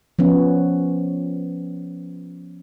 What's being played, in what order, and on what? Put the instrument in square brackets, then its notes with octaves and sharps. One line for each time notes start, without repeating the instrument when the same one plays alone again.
[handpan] F3 B3 C#4